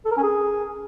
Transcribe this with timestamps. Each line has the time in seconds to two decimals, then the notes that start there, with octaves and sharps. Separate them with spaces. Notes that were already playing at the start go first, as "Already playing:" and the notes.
0.05 A4
0.11 A#4
0.17 C#4
0.23 G#4